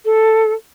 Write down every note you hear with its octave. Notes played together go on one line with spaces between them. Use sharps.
A4